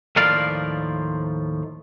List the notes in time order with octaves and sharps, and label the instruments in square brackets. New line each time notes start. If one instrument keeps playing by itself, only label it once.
[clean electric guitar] D#2 A2 F3 A#4 D5 F5